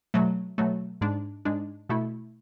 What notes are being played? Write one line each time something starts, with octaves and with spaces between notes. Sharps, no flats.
B2 F#3 A3
B2 F#3 A3
G#2 G#3 D4
G#2 G#3 D4
B2 A3 E4